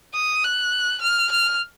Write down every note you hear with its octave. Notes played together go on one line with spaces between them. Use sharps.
D#6
F#6
F6
F6